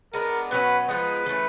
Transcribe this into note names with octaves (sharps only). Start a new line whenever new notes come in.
G#3 B3 D4 A#4
B2 F#3 A#3 C#4 B4
F3 G#3 B3 D#4 B4
E3 A3 C#4